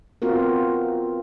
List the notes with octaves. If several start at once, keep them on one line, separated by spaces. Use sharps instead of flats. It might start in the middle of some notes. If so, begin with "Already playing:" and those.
B3 C4 F4 F#4 A#4